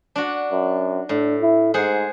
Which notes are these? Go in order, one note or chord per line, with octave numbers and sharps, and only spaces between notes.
D4 F#4
F#2
A2 D4
E4
G#2 G#4 C5 F#5